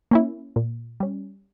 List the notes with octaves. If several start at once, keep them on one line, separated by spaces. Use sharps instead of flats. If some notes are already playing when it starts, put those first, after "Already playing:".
A#3 C#4 E4
A#2
G3 C#4